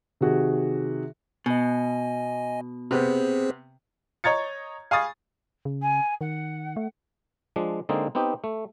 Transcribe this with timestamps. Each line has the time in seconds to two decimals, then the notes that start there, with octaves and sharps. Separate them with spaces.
0.21 C3 D#3 F#4 G#4
1.46 B2 D#5 G#5
2.91 C3 B3 C4 G#4 C5
4.24 C#5 D#5 A#5 G#6 A6 C#7
4.91 F5 G#5 B5 C#6 D#6 A6
5.65 C#3
5.82 G#5
6.21 D#3 F#5
6.76 A3
7.56 F3 G#3 D4
7.89 D3 G#3 A#3 C4 D#4
8.15 B3 C4 D#4 G4
8.44 A3